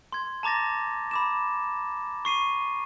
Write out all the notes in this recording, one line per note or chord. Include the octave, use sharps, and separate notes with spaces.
C6 G#6
A5 A#5 D6 A6 A#6
B5 D6 E7
C#6 C7 D#7